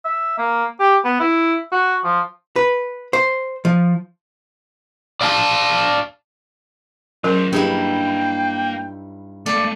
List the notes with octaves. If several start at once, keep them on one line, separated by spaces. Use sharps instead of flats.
E5
A#3
G4
B3
E4
F#4
F3
B4
C5
F3
D5 F5 G#5 A5
F#3 C#4 F4 G#4 A#4 C5
G2 A#3 D#4 E4 G4 G#4 F#5 G5
A3 A#3 A4 D5